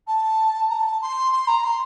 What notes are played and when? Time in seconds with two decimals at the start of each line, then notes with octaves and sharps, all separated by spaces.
0.07 A5
0.69 A#5
0.74 A5
1.01 C6
1.32 C6
1.47 A#5
1.64 C6